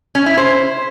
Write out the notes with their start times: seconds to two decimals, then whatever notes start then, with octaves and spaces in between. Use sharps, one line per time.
0.15 C#4
0.26 E4
0.37 C5